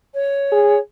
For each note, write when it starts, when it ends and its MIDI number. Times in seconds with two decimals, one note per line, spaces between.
0.14 0.79 73
0.52 0.79 68